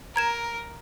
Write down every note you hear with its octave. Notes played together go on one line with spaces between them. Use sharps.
A#4 A#5 G#6 E7